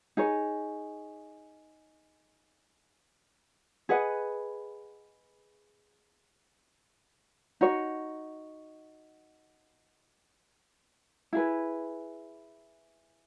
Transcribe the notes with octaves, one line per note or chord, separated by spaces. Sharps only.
D#4 G#4 C#5
G#4 B4 D#5 F#5
D#4 F#4 C#5
E4 G#4 B4